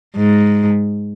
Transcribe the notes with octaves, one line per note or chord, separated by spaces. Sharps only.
G#2